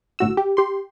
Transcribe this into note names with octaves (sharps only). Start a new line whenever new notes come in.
G1 A2 F#4 E6
G4
G4 C6